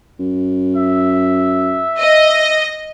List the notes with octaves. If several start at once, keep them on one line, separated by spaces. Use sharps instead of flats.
F#2
E5
D#5